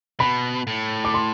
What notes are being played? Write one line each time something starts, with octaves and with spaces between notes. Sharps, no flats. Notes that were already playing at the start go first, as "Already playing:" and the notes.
B2 B5
A2
D6
C6